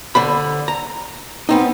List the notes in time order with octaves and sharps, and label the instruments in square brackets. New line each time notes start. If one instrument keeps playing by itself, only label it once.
[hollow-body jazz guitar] D3 C5 B5
A#5
B3 C4 D#4